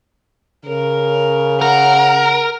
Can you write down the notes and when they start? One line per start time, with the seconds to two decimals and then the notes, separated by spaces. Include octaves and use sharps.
0.66 C#3 A#4
1.62 A#4 F#5 A#5